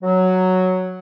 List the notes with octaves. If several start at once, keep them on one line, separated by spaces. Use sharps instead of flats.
F#3